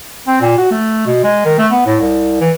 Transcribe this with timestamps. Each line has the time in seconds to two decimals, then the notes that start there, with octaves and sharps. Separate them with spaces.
0.27 C4
0.41 A#2
0.58 F#4
0.71 A3
1.07 B2
1.24 G#3
1.45 D#3
1.58 A3
1.71 B3
1.86 A2
2.00 C2
2.41 E3